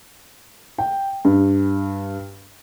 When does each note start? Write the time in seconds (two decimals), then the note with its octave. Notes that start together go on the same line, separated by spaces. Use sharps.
0.78 G5
1.25 G2